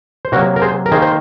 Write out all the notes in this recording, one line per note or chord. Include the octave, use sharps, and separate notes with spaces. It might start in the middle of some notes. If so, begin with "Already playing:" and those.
C5
C3 F#3 A#3 F#4 A#4
A#4
G#4 C5
A#4
D#3 G#4 C5
A#3
C5